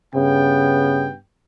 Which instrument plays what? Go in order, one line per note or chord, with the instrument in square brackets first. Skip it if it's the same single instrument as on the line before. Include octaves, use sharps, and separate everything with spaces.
[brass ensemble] G2 B3 G5 [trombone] C#3